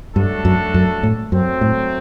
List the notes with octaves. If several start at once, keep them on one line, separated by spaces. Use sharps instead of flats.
G2 F#3 A3 D4 F#4 A4
F#2
F#2
A2
F#2 F#3 A3 C4
A2